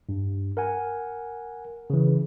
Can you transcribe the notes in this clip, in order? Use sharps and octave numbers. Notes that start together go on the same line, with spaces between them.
G2
A#4 F#5 G#5
C#3 E3